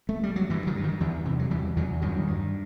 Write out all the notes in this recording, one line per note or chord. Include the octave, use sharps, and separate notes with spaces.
A3
G3
F#3
G2 E3
D#3 F#3
G2
D#3
E2 E3
C3 E3
F#3
E2 E3 G3
E2 D#3 F#3
G2 D#3 F#3
G2